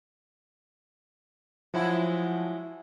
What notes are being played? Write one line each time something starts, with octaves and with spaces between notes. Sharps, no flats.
F3 F#3 G#3 E4 F#5